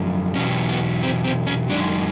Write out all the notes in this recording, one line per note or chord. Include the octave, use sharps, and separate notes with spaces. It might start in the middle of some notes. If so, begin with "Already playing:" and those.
Already playing: F#2 D3 F3 A3
E2 B2 F#3 C#4
B3
C4
C4
C#4
F#2 D#3 G#3 D4